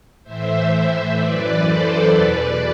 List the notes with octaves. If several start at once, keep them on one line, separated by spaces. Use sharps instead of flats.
A2 E3 C5 E5
F#2 E3 B4 D5
A4 C5
E2 B2 B4 D5